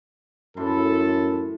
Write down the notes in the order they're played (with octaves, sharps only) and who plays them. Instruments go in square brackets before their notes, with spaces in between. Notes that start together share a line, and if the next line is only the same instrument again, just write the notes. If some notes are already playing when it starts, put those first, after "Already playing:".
[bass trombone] F#2 [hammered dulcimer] A2 E3 C6 [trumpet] A4